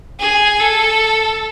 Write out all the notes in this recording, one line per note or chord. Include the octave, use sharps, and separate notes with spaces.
G#4
A4